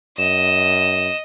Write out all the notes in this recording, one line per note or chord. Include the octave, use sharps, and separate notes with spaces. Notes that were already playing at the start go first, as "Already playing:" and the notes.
F#2 D#5 E7